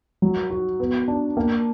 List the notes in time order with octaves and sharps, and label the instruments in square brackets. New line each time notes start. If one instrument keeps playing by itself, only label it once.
[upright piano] F#3
F#4
B3
D4
A#3